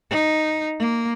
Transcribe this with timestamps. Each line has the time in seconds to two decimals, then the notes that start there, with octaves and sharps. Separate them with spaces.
0.10 D#4
0.79 A#3